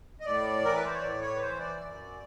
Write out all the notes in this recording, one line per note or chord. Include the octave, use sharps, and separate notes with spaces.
D#5
A2 D5
E3 A#4
B4
C5
C#5
A2 D5
C#5
B4
E3 C5
D5
F#2